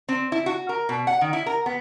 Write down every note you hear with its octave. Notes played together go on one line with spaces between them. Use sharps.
C4
E4
F#4
A#4
B2
F#5
D#3
E4
A#4
B3